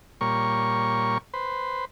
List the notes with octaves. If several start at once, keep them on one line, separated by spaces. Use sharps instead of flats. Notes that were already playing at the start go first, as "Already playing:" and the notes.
A#2 G3 A#4 C#5 C#6
B4 C5